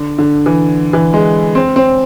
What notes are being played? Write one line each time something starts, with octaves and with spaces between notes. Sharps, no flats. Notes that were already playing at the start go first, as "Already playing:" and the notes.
Already playing: D3
D3
E3
E3
G#3
C4
C4